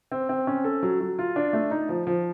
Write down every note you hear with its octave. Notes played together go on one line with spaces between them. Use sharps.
C4
C4
C#4
A4
F#3
F#3
F4
D4
A3
D#4
F3
F3